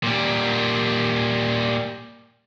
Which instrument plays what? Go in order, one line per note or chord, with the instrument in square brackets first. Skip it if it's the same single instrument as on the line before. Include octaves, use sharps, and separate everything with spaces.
[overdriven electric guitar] A#2 G3